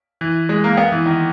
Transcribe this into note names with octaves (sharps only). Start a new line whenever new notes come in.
E3
G#3
A#3
B3
E3
D#3